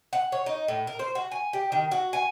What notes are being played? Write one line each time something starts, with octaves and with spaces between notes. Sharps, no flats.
F#5
C#5
D#4
A2
A#4
C5
F#4
G#5
G4
D#3
F#4
G#5